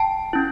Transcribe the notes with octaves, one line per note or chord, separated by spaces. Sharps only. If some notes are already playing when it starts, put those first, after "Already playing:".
Already playing: G5 A5
C#4 E4